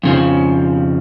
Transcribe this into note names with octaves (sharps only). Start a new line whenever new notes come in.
F2 C#3 F3